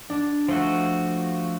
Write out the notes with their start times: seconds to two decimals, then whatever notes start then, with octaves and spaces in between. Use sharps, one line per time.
0.10 D4
0.48 F3 A3 F#4